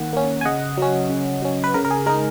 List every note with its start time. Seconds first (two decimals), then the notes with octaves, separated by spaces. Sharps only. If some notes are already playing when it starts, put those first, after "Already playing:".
Already playing: D#3 A#3 F#5
0.13 A#3 C#4
0.41 G#5
0.45 C#3 D#5 F#5
0.77 F#3 C#4
1.09 C#3
1.42 F#3 C#4
1.64 B4
1.74 C#3 A#4
1.85 A#4
1.91 G#4
2.06 G#3 D#4 A#4